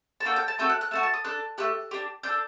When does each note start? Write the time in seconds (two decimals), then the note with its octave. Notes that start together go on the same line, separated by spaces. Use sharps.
0.20 A5
0.25 A#3 D4 F#4 A4 G5
0.36 G5
0.48 A5
0.59 A3 C4 F#4 A4 G6
0.70 F#6
0.81 F#6
0.91 A3 D#4 F#4 A5
1.03 A5
1.14 D#6
1.25 D4 A4 F#6
1.58 A3 C4 G4 F#6
1.91 D4 G4
2.23 D4 A4 G6